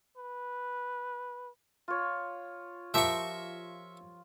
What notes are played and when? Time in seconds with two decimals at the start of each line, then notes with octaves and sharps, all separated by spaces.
0.17 B4
1.88 F4 C#5
2.94 F3 G4 A#4 E5 C#6